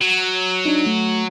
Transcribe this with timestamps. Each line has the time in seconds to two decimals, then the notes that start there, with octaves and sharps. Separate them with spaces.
0.01 F#3
0.66 D4 D#4
0.86 A3